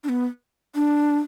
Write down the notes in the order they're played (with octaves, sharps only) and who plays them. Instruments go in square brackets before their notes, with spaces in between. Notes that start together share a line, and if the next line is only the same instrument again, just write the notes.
[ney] D4
B3
D4